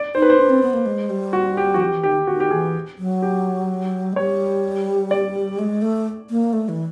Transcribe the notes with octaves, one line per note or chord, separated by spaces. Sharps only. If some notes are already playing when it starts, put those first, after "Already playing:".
Already playing: D5
D#4 C5
B4
C5
D4
C4
B3
A#3
G#3
G3
F#4
G4
E3 F#4
F3 G4
E3
D#3 G4
D#3 F#4
G4
E3 G#4
F#3
G4
G#3
G3 C#5
D5
G#3
A3
A#3
A3
E3